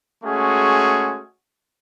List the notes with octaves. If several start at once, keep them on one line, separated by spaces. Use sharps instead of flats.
G#3 A3 C#4 F#4 G#4